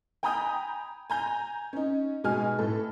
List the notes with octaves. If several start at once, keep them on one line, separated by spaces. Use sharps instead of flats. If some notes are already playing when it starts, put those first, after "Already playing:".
G5 G#5 A#5 B5 D#6 G6
G#5 A#5 G6
C#4 D#4
B2 G#3 D#4 G#5 F6
A2 A4